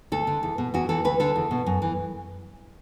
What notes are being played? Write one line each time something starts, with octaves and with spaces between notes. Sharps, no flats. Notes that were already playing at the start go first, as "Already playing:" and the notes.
D2 A4
D3
E2
B2
E2 F#4
E3 A4
D2 B4
D3 A4
E2
B2
F#2
E3